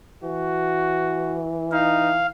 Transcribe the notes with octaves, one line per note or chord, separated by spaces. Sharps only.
E3 F#4
D#4 F5